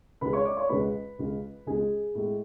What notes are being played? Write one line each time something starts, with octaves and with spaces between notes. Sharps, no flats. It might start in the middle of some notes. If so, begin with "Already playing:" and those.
C#2 C#3 G#3 B4 B5
C#5 C#6
D5 D6
C#5 C#6
C#2 C#3 G#3 B4 B5
C#2 C#3 G#3
C#2 C#3 G#3 G#4 G#5
A2 G#3